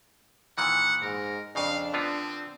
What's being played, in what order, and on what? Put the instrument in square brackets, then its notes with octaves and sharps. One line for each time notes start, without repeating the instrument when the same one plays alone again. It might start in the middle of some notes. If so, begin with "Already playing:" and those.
[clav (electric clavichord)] A#2 D#3 E3 [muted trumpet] F#5
[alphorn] G#2 [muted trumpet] A#4
[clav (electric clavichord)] F2 C#3 [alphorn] D4 [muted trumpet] F5
[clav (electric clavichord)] D3 B3 F4 [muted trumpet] C4